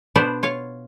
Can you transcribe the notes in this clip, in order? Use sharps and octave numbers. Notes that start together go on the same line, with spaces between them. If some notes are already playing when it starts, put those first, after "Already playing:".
B2 B3 D4 C5 D5
F4 C#5 F5